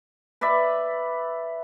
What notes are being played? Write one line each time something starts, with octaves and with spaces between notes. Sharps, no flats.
B4 D5 E5 B5